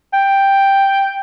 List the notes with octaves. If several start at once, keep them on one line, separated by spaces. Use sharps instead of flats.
G5